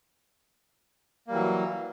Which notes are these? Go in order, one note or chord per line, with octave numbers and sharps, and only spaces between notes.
E3 F#3 G3 A#3